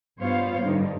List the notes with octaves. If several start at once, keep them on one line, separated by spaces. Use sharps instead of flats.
G2 B3 F4 C5 C#5 F5
G2 D3 D#4